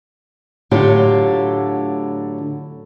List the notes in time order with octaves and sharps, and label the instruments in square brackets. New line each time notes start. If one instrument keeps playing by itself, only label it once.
[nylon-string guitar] A2 D3 F#3 F4 G4